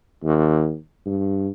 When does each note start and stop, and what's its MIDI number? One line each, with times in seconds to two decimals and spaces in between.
0.24 0.75 39
1.06 1.48 43